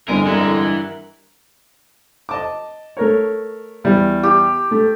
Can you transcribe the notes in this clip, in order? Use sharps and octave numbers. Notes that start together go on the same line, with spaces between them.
G1 F2 D3 G#3 E4 A#4 E5 G#5
G2 E3 A#4 F#5
D#5 A5 D6
A3 A#4 C#5
E2 G3
G4
A3